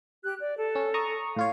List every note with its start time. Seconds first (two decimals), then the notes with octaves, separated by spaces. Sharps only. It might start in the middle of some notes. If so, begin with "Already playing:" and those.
0.23 G4 F#6
0.39 D5
0.56 A4
0.75 C#4
0.94 A#5 C#6 D#6
1.36 A2 F4 C#5 F5